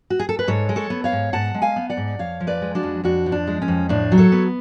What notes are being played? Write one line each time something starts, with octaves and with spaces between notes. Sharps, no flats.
F#4
G#4
A4
B4
G#2 A4 C#5
G#3
A4 C#5
B3
C#5 F5
G#2
G#2 F#5 A5
G#3
F5 G#5
B3
D5 F#5
G#2
F2 C#5 F5
F3
B4 D5
G#3
D4 F#4
F2
F2 D4 F#4
F3
D4
G#3
C#4
F2
A2 D4
F#3
A4 C#5
B3